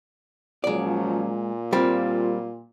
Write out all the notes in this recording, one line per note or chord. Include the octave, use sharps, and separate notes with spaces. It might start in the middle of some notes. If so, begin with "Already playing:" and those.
A#2 F3 F#3 G#3 C#4 D5
G3 A#3 C4 F4